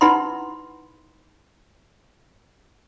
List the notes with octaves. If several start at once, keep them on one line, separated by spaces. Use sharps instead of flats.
D#4 E4 B4 F#5 B5 C6